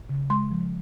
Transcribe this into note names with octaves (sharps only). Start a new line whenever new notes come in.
C#3
G#3 C6
F3